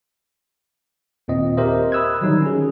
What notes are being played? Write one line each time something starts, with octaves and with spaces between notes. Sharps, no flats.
D#2 A#2 C4 D#5
G4 A#4 C5 D#5 E5
B5 D#6 E6 F#6 G#6
D3 D#3 F#3 G3 D#4
C#4 G#4